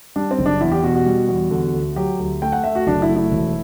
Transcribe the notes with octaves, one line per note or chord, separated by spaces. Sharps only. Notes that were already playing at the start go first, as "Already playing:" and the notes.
G3 D4
C4
F#1
D4
E2 E4
G4
B2 F#4
F#4
G3
E2
D3
D2
F#3 G4
D2
A3 G5
F#5
A3 E5
F#4
F#1 D4
E4
A3
E4
E1